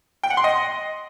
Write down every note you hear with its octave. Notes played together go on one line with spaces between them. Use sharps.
G5
F#5
C6
D#5